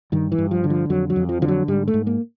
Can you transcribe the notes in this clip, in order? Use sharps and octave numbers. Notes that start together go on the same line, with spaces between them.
G2 D#3
E3
G2
F3
D3
F3
F2 F#3
F#3
F2
F3
D3 F3
F#3
G#2 G3
A3
G#2
A#3